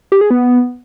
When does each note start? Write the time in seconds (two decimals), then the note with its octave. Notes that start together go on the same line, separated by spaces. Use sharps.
0.12 G4
0.21 G#4
0.31 B3